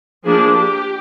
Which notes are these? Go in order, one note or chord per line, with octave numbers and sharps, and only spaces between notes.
F3 A#3 D4 G#4
G4